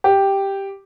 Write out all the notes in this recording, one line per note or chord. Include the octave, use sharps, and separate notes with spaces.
G4